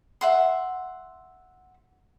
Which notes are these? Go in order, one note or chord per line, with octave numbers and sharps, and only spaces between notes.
E5 F#5 C6